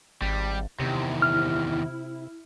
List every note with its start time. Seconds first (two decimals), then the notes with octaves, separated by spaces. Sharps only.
0.22 G#1 G3
0.80 E2 C3 D#3 E4
1.22 F6